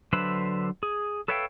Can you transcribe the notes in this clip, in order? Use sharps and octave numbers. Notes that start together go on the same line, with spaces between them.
D3 F#3 D4 B4 C5 E5
G#4
A4 B4 C#5 E5 F5 G5